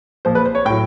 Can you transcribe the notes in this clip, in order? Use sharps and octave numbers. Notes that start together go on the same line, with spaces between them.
A#2 F3 C5
B4
C5
C#5
A2 F#3 G5